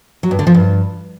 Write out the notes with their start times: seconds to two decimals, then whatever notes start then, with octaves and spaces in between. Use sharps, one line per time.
0.23 F#3
0.31 G2
0.39 D3
0.47 F3
0.54 G2